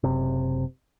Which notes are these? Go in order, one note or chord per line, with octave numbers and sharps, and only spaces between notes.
F#1 C3